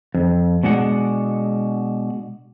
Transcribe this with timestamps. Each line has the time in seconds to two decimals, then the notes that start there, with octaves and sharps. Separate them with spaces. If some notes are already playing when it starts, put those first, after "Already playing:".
0.14 F2
0.63 B2 G#3 D4 F#5